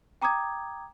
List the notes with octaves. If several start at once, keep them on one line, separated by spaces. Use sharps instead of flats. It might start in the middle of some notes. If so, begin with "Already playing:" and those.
G5 A#5 D6 D#6 G#6